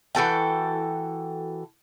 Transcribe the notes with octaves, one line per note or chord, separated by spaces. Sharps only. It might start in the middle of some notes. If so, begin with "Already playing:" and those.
E3 F#4 A4 G5